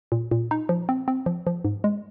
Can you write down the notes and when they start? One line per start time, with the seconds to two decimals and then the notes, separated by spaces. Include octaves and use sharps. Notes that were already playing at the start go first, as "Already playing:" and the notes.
0.12 A#2
0.31 A#2
0.51 D#4
0.69 F3
0.89 C4
1.08 C4
1.26 F3
1.47 F3
1.65 G#2
1.84 G#3